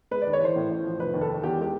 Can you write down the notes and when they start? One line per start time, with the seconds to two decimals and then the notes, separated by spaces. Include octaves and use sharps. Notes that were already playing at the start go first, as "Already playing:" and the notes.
0.11 G#3 B4
0.22 D#2 D5
0.33 C#5
0.40 E3 C5
0.56 A2
0.69 A1
0.84 F3
0.99 F1 B4
1.14 D#2
1.21 A4
1.29 D#3
1.43 E2 G4
1.58 G#3 G4